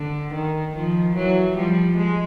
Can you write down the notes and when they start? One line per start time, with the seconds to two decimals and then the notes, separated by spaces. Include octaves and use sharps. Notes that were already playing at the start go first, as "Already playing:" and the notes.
Already playing: D3
0.33 D#3
0.75 D#3 F3
1.15 E3 F#3
1.56 F3 G3
1.96 G#3